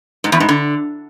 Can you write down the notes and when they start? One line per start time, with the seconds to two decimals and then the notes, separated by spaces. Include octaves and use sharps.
0.24 G#2
0.32 E2
0.40 G#2
0.49 D3